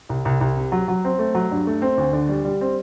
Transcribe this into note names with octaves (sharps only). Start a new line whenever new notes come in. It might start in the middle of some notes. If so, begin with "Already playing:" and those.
C2
C2
C2
C3
F#3
F#3
C4
A3
F#3
G2
A3
C4
D2
D3
G3
G3
C4